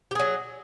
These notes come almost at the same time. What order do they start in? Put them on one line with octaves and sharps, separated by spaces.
G4 G#4 F#3